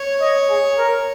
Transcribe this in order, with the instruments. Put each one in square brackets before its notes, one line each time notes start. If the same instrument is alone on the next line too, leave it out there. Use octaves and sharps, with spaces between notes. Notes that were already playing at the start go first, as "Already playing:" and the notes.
Already playing: [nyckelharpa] C#5
[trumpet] D#5
G#4
A#4